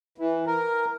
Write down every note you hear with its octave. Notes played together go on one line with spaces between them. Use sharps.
E3
A#4